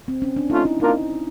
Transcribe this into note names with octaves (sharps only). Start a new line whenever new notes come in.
C4
C#4
D4
A3 C#4 D#4 F4
E4
A#3 D4 D#4 F4 A#4